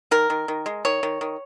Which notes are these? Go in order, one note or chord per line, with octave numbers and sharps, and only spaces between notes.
D#3 A#4
D#3
D#3
G#3
D#3 C#5
D#3
D#3